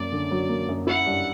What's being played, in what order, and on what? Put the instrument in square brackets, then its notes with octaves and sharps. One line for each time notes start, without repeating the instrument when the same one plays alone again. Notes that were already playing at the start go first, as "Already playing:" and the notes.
Already playing: [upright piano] F#2 A#3 [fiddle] D5
[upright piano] D3
F#3
A#3
F#2
[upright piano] E4 [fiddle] F#5
[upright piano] G2